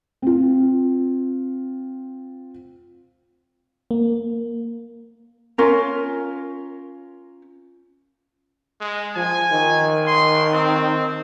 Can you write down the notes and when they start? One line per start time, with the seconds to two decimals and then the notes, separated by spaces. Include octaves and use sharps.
0.22 C4 F4
3.91 A#3
5.58 C#4 F4 A#4
8.80 G#3
9.16 F3 G#5
9.52 D#3
10.07 C6
10.53 C4